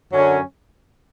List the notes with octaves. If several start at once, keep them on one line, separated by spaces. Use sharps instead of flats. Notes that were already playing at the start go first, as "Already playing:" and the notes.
F#2 D3 F#3 C#4